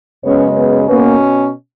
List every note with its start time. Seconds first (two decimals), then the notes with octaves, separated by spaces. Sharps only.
0.24 F#2 C#3 G#3 B3 C#4 C#5
0.56 B3 B4
0.89 B2 A#3 B3 C#4 B4